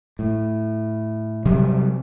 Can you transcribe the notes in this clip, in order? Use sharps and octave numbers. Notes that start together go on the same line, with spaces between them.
A2
C3 F#3 G3